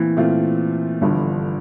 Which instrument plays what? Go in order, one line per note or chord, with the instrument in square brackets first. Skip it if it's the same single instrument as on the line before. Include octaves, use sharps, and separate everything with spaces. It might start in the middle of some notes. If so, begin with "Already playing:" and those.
Already playing: [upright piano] A#2 A3 C4 [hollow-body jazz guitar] E3
[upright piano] A#2 A3 C4 F4
G1 G2 D3 F3